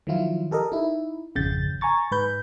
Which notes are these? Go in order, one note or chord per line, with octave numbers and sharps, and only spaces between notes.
D#3 F3 F#3 E4 F4
G4 A4 A#4 D#5
D#4 E4
G#1 F2 C#3 G6 A6
G#5 A#5 C#6 A6
G#2 B4 B5 G6